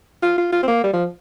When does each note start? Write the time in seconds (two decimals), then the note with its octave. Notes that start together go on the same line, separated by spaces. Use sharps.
0.23 F4
0.38 F4
0.53 F4
0.63 C4
0.68 A#3
0.84 G3
0.93 F3